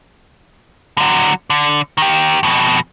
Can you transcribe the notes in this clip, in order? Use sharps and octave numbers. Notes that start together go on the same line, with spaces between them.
D3 F#3
D3
D#3 G4
F2 B2